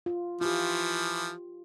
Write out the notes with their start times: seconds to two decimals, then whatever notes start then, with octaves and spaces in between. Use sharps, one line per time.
0.06 F4
0.41 E3 F3 F4 G4